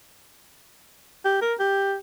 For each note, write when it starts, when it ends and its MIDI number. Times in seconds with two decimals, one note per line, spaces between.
1.25 1.41 67
1.41 1.54 70
1.59 1.95 67